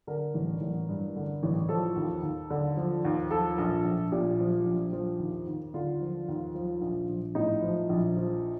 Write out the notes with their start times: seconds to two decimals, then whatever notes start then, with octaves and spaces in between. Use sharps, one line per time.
0.07 D3 A#4
0.34 A1
0.61 A1
0.89 G2
1.16 D3
1.43 A1
1.69 F3 A4
1.96 D#2
2.23 D#2
2.50 D3
2.77 F3
3.05 D#2
3.31 F3 A4
3.58 A#1
3.85 A#1
4.12 A#2 G4
4.39 F3
4.66 A#1
4.93 F3
5.19 D#2
5.47 D#2
5.74 D3 F4
6.01 F3
6.28 D#2
6.55 F3
6.81 A#1
7.09 A#1
7.35 A2 D#4
7.62 F3
7.89 A#1
8.17 F3